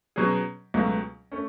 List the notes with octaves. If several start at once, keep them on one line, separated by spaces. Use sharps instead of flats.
B2 F#3 C#4 G#4
C#2 B2 F#3 A3
A3 C#4